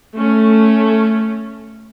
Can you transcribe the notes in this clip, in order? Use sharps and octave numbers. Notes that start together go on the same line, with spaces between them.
A3 C#4